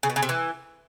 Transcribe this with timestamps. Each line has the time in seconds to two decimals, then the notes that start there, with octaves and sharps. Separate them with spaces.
0.03 C#3
0.10 B2
0.16 C#3
0.23 C3
0.29 E3